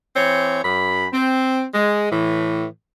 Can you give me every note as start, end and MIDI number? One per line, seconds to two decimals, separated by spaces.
0.15 0.62 52
0.15 0.62 60
0.15 0.62 73
0.63 1.06 42
0.63 1.06 83
1.12 1.64 60
1.74 2.09 56
2.11 2.64 45
2.11 2.64 52